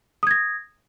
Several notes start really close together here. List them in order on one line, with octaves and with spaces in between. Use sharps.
D#6 G#6 A#6